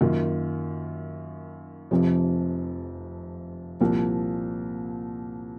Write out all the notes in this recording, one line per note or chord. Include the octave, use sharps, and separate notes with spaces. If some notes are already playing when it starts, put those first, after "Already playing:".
F#2 D#3 A#3 F4
F1 F2 C3 F3
C2 A#2 F3 A#3